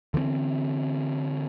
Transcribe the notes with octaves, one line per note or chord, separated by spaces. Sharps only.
D3 E3 G3 C4